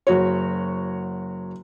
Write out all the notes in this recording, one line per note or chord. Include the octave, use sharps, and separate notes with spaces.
F#1 F#4 C#5